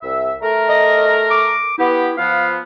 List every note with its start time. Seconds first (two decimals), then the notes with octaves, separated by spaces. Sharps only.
0.01 C2 E5
0.42 A3 A#4
0.69 D#5
1.30 D6
1.78 B3 E4 G4
2.17 F3 B3 F5